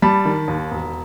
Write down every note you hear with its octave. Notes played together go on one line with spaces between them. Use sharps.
G3 A5 B5
D#3
D#2
E1